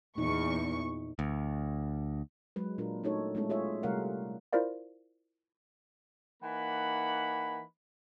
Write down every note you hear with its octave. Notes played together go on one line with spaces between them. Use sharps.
E2 A#2 D#4 C#6
D2
F#3 G#3 B4
A#2 D4 F4 A#4
A3 C#4 D#4 F#4 A4 C#5
G#3 A3 B3 C#4 E4 A4
F4 G#4 C#5 E5
C3 G3 A3 A#4 F5 F#5
E4 F4 A#4 C5 D5 F5
E3 A#3 D#4 F#5 B5